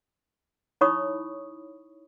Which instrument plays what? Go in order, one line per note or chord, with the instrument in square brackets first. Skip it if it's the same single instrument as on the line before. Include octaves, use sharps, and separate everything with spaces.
[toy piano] D#4 E4 C#5 B5 C#6 D#6